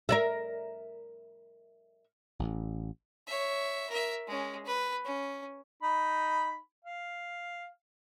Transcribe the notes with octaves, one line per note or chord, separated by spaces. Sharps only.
A#4 D5 E5
A1
C#5 E5
A#4 E5
G#3 C#4
B4
C#4
D#4 B5
F5